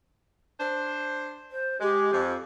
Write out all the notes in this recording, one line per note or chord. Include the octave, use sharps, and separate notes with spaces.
D4 C5
C5
G#3 G4
F2